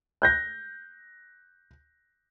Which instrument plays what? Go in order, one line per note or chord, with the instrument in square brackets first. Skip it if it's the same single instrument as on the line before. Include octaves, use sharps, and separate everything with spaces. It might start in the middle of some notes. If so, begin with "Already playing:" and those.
[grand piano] F#6 G6 A#6